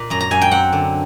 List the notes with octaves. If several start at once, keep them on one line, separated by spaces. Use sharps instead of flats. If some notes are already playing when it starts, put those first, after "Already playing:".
Already playing: A#2
F#2 A#5
A#5
F#2 G#5
G5
C4 F#5
D3